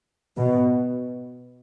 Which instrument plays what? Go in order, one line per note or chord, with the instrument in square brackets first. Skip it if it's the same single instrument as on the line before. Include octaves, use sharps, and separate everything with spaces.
[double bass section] B2